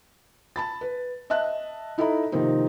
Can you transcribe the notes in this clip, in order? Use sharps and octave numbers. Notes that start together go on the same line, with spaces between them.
A5 B5 A6
B4
D#5 E5 A5 F#6
D#4 E4 A4 D#5 A#5 B5
C3 D#3 F3 A#3 C4 D#4